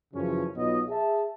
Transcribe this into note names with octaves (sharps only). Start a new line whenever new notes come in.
F#2 C#3 E3 F3 C#4
B1 B3 F4 C#5 D#5
G#4 E5 A5